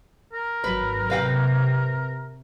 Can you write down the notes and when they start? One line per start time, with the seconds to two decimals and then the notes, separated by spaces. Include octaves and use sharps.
0.33 A#4
0.64 G#1 F#3 B4
1.10 C3 B4 F5 G5